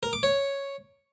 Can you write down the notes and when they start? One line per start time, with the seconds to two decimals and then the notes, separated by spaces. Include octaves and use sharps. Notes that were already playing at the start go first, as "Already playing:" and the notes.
0.03 A#4
0.13 D6
0.23 C#5